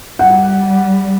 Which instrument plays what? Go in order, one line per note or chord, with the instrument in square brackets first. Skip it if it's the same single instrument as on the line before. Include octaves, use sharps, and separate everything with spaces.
[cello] G3 [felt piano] F#5